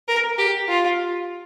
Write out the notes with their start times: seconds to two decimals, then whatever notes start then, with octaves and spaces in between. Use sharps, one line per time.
0.08 A#4
0.38 G4
0.68 F4